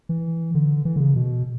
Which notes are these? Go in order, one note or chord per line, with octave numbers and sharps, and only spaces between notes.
E3
D3
E3
D3
C#3
B2